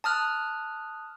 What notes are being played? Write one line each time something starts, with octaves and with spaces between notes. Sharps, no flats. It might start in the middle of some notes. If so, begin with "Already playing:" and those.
A5 D#6 F6 F#6